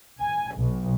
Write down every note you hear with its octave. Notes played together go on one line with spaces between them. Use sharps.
G#5
B1